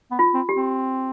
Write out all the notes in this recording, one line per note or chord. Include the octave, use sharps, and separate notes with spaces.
B3
F4
C4
G4
C4